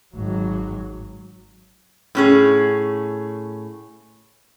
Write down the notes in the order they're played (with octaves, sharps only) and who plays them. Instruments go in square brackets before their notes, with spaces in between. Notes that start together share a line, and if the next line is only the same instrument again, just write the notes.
[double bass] G#1 F#3
[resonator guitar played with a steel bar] A2 C#4 G#4